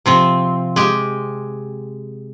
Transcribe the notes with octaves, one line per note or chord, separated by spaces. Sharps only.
C3 F3 C4
G#3 G4